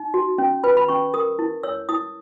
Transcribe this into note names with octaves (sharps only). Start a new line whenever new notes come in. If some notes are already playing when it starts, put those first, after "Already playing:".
Already playing: D#4
F#4
C#4
B4 B5
B5
C#4 C#6
A#4 D#6
E4
C#5 E6
E4 D#6